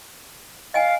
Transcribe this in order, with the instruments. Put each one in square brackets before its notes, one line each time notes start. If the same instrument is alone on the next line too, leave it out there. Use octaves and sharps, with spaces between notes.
[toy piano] D#5 G5 G#5 [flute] F5